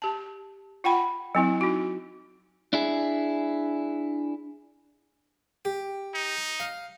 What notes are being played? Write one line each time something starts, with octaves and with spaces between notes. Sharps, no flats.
G4 A5
F4 F#5 G5 B5
F#3 C4 E4
D#4 F#4
D4 E4 G#4
G4
D#4
F5